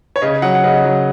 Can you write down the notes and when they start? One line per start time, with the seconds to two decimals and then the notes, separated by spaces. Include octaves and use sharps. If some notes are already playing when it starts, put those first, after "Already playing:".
0.16 C#5
0.22 C#3 D#5
0.42 F#3 F#5
0.55 F#5
0.63 C#3 D#5
0.85 F#3